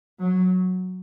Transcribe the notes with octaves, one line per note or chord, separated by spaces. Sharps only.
F#3